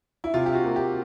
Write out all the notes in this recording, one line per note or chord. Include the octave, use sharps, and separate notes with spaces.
E4
C3 F4
G4
F#4
A#3
G4